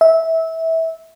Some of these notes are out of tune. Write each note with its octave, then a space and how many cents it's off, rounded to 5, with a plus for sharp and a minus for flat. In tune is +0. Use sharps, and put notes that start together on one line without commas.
E5 -20